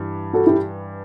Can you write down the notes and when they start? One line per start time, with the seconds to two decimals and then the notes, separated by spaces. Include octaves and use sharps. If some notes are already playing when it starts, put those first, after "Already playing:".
Already playing: G2 E3 G3
0.33 F#4 A4
0.46 E4 G4